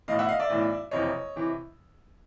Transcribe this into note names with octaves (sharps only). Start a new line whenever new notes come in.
B1 A2 E3 D#5 F5
E5 F#5
D#5 F5
D5 E5
B1 A2 E3
F#1 F2 C3 E3 C#5 D#5
C3 E3